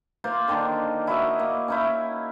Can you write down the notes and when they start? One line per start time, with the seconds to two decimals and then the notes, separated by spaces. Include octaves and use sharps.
0.24 A#3 F4 C5
0.48 D3 D#3 D4
1.07 E4 F#4 D#5
1.39 A#3
1.68 C#4 D#4 E4